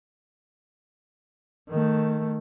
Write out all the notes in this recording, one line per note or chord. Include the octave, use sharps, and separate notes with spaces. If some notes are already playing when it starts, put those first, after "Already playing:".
D#3 A3